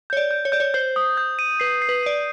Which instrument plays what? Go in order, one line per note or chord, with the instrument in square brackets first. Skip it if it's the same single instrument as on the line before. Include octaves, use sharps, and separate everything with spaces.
[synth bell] C#5 [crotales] G6
[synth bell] D5
[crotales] G6
[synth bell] C#5
[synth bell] D5 [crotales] G6
[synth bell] C#5
[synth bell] C5 [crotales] G6
[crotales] D#6
G6
D#7
[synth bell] B4 [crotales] C7
[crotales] C7
[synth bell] B4
[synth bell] D5 [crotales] D#7